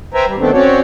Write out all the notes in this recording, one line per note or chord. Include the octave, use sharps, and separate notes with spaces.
B4 C5 E5 G5 G#5 A#5
G3
D#3 A3 B3 C4 D4
C4 C#4 F#4 C#5 D5